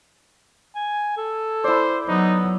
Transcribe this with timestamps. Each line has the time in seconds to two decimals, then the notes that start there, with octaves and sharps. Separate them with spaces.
0.75 G#5
1.17 A4
1.64 E4 C5 D5
2.08 F#3 B3 D#4